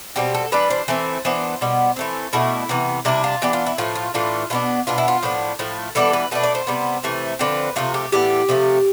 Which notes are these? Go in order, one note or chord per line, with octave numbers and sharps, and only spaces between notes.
B2 G3 C4 G4
A4
E3 G3 D4 B4
C5
E3 A3 C4
E3 B3 D4 C5
B2 G3 B3
E3 A3 C4
B2 A3 D4 E4
C3 E3 B3
C3 G3 D4 E4
F4
E3 B3 D4 G4
F4
E4
A2 F3 A3 F4
F4
A2 E3 A3 D4 F4
B2 B3 D4 F4
B2 B3 D4 F4
E4
F4
A2 F3 B3 D4
A2 F3 A3
E3 G3 B3 D4 A4
B4
B2 A3 D4 B4
D5
C5
C3 G3 B3
C3 E3 A3
D3 F3 C4 B4
C3 F3 A3 F4
G4
A2 E3 B3 D4 G4
C3 F3 A3